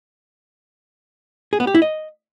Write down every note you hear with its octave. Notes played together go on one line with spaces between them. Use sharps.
G#4
B3
G4
E4
D#5